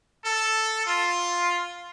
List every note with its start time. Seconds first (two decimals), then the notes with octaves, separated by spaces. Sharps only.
0.24 A4
0.86 F4